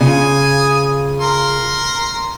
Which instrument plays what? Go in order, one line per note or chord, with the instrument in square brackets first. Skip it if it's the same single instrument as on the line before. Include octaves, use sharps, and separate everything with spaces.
[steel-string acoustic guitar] C#3 F4 [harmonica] G#5 D#6
[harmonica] A#4 C6